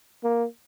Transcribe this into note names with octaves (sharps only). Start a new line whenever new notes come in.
A#3